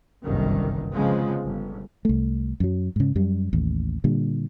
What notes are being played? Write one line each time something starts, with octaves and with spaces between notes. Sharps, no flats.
G1 C2 F#2 D#3
F2 C#3 F3 G#3 B3
G1
C2 A3
F#2 F#3
G#2 C#3
F#2 G3
A1 D#2
A#2 D3 G3